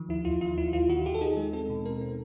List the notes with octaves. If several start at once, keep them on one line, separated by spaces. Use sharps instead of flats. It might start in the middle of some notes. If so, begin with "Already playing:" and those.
Already playing: D#3 F3
D#2 E4
D#2 F4
D#3 F4
D#2 E4
D#2 F4
D#3 F#4
D#2 G4
A4
D#4 G#4
G#3
C4 A4
B2
C4 A#4
C4